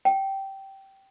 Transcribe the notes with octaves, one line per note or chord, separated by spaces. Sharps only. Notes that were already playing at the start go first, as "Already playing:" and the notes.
G5